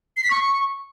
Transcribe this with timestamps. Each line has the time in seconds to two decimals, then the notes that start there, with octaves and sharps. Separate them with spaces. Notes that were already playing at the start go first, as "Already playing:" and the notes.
0.17 C7
0.24 B6
0.31 C#6